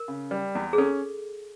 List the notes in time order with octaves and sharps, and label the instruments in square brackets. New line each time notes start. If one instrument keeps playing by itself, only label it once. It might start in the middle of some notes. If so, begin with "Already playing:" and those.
Already playing: [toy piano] A#4
[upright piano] C#3
G3
E2
[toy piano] G#4
[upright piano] C#4 [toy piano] A4